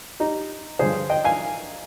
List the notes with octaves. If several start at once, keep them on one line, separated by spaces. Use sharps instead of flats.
D#4 G4
G2 D3 F3 G#4 C5
D#5 G5
F5 G#5